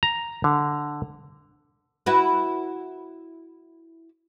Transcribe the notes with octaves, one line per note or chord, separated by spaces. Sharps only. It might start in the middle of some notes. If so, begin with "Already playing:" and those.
A#5
D3
E4 F#4 B4